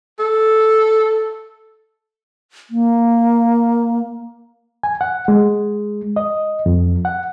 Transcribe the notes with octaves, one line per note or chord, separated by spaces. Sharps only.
A4
A#3
G#5
F#5
G#3
D#5
F2
F#5